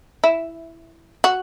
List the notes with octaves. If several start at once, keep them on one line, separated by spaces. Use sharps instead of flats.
E4
F#4